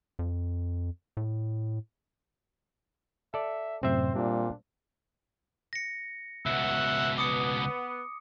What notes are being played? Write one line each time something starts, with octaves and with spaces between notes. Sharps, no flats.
F2
A2
A4 D5 E5
F#2 A2 C3 C4 C5 E5
A#2 G3 D4
A#6 C#7
C#2 B2 E5 F#5
B3 D6 D#6 C#7